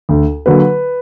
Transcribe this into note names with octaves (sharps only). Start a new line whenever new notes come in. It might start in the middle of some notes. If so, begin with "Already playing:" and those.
D2
D3 F#3 A#3 B4